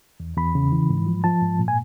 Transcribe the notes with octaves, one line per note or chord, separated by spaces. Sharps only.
E2
E2 B5
C#3
E3
G#2
F3
F3 A5
G#2
A#2
G#5